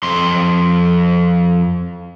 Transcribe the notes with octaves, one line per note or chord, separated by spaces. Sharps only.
F2 C6